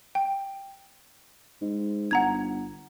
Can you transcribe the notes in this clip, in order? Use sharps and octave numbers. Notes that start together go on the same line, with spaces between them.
G5
G#2
G1 F#5 A#5 G#6